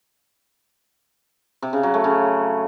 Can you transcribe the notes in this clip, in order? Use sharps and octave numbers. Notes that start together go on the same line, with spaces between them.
C3
C#3
F#3
A3
C#3